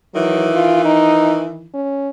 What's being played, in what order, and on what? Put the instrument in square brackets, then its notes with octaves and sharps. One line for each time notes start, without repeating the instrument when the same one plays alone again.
[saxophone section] D#3 E3 [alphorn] F#3
[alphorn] F4
D#4
C#4